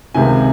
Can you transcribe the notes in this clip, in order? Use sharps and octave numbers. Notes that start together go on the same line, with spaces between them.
C#2 C3 D#3 G#5